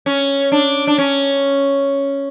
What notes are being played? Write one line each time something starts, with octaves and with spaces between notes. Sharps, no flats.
C#4
D4
D4
C#4